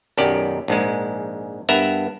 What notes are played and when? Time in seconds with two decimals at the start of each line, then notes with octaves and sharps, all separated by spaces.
0.17 B1 F#2 D#3 G4 D5
0.68 A#1 G#2 G#3
1.69 G2 B3 A#4 E5 A#5